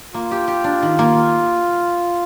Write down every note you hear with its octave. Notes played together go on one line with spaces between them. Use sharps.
A#3 F4
G4
G4
D4
D#3
A#3